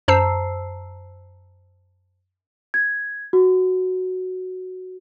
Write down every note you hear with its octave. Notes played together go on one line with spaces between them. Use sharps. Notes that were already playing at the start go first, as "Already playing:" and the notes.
F#2 C5 A5 A#5 E6 C7
G#6
F#4